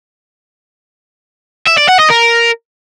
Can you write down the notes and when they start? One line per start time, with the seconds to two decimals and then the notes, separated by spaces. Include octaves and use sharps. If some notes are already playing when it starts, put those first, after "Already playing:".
1.67 E5
1.78 D5
1.89 F#5
1.99 D#5
2.10 A#4